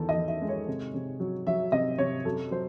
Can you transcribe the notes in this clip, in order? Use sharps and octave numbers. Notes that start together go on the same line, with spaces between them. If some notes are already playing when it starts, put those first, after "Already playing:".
Already playing: E2 D#3 A4
D#5
E2
E5
G#3
C#5
C3
C3
F#3
F#3 E5
C3 D#5
C3 C#5
F#2 A4
F#3 C5